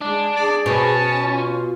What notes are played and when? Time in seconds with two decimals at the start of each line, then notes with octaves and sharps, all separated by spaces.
0.01 G#3 D4
0.36 G#4 D5
0.66 B2 C#4 A5
1.24 F4